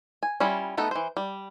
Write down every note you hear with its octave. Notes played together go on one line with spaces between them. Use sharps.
G#5
G3 C#4 E4 F4
A3 B3 D#4 A4
E3 C5
G3